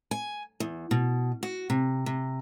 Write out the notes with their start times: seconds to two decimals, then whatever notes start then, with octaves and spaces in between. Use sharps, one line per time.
0.11 G#5
0.60 E2
0.91 B2
1.43 F#4
1.70 C3
2.06 C3